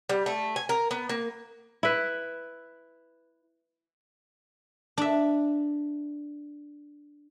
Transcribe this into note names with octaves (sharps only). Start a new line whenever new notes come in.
G3
A3
G#5
A#4
B3
A#3
E4 B4
D4 E5